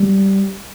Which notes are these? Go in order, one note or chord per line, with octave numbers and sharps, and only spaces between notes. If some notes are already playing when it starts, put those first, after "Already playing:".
Already playing: G3